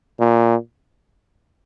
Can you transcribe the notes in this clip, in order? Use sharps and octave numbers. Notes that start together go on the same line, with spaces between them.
A#2